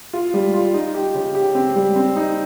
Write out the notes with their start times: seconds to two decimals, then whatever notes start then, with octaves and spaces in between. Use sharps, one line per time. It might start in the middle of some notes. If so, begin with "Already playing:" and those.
0.13 F4
0.34 G3
0.54 F4
0.74 D#4
0.94 G4
1.14 C#3
1.35 G4
1.55 C4
1.76 G3
1.96 C4
2.16 D#4